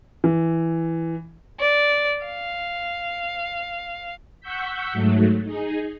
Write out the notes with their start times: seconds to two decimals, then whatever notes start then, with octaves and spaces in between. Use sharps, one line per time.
0.24 E3
1.60 D5
2.25 F5
4.41 F#5 C#6 E6 G6 B6
4.93 G#2 F#3 A3
5.44 D#4 G#4